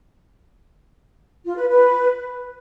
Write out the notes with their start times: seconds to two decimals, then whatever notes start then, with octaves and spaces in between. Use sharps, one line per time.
1.46 F4
1.57 B4
1.68 B4